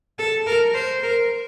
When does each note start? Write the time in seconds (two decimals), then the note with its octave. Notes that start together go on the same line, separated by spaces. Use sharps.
0.19 A4
0.46 A#4
0.74 C5
1.03 A#4